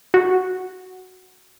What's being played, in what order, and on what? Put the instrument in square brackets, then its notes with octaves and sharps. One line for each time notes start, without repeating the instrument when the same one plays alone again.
[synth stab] F#4